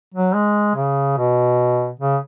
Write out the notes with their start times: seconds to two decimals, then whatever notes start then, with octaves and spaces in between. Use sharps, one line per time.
0.14 F#3
0.35 G#3
0.75 C#3
1.17 B2
2.00 C#3